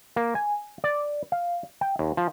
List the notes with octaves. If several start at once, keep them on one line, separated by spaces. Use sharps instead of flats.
A#3
G#5
D5
F5
G5
D#2
F3